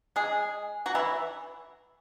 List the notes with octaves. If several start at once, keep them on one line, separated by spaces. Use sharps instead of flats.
G#3 G#4
F#3 F#4
E3 E4